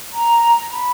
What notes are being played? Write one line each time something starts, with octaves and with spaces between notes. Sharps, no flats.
A#5
B5